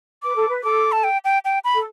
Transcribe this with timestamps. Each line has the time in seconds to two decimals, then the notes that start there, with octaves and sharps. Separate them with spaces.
0.23 B4 D6
0.35 A4
0.48 B4
0.63 A4 D6
0.92 A5
1.04 G5
1.25 G5
1.45 G5
1.64 B5
1.75 A4